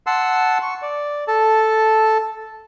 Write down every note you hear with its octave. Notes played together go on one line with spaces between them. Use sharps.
F#5 A5 C6 E6
C#6
D5
A4 A5